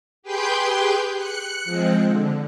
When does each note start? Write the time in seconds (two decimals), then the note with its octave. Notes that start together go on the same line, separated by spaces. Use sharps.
0.23 G4 G#4 B4 G5 C6 G6
1.15 F#6 C#7
1.64 F3 G#3 C4
2.06 D3